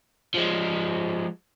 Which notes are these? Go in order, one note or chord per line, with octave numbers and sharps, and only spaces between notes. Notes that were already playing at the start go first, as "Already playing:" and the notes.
F3 G#3